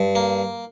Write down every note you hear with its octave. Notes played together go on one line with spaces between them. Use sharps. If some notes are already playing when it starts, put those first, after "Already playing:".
Already playing: G2
A#3